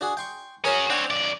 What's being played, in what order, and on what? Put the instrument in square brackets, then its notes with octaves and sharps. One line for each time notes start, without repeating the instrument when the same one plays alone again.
[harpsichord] D4 F#4 G#4
G5 C6 C#6
[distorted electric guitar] C#4 F#4 [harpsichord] G#4 A#4 C#5
[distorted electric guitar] C4 C#5 [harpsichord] D4 F#5
[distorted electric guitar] F2 D5